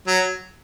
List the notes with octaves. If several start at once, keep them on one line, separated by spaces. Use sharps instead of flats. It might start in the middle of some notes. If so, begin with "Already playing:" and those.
F#3